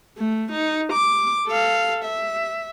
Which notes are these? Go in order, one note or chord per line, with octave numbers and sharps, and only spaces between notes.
A3
D#4
D6
A4 F5
E5